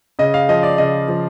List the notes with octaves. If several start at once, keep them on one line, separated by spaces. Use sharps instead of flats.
C#3 D#5
F5
F3 D#5
D5
C#3 D#5
F3